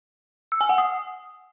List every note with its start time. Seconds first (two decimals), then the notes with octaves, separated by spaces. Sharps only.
0.52 E6
0.61 G#5
0.69 F#5
0.78 D#6